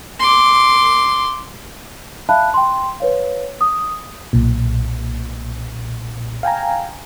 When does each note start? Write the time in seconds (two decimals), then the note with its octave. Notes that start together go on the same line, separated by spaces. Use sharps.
0.20 C6 D6
2.29 E5 F5 A5 B5 F#6
2.54 G5 C6
3.00 B4 C#5 F5
3.61 D#6
4.33 B1 A#2
6.43 F5 G5 G#5 A#5